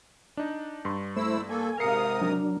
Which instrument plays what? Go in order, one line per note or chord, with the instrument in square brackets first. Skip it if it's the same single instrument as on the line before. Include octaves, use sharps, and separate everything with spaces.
[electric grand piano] D4 D#4
G2 C6
[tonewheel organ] A3 C5 [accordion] E4 E6
[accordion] A#3 A4 [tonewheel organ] G#5
[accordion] G#2 C3 D#6 [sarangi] A#4 [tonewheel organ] F5 [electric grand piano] C7 C#7
[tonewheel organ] F#3 D4